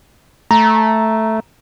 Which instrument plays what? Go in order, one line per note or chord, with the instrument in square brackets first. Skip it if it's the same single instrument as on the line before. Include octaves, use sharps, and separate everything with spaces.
[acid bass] A3 [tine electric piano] A#5